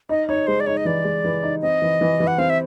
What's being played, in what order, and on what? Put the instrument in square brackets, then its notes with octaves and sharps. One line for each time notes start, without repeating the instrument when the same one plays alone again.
[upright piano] D#4 [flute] D#5
[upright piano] D#4 [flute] C#5
[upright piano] G#3 [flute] C5
[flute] D5
[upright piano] D#4 [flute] C#5
[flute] D#5
[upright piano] E3 [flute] D5
[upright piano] G#3
E3
D#4
[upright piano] C4 [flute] D#5
[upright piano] E3
E3
E3
[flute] F#5
[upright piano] C4 [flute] F5
[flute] E5